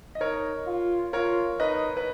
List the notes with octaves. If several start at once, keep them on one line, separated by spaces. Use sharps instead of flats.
D#5
D#4 A#4 C#5
F4
F4 A#4 C#5
D#4 B4 D#5
B4